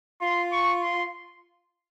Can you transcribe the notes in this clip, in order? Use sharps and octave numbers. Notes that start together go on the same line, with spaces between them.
F4 C6
C#6
C6